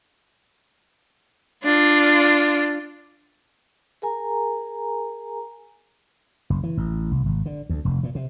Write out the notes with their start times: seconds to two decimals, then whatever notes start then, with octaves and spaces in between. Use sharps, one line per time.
1.64 D4 F4
4.02 G#4 A#4 G#5 A#5
6.50 F#1
6.63 E3
6.77 A1
7.11 C2
7.26 G#1
7.46 D3
7.69 D2
7.85 F1
8.03 A#2
8.15 C3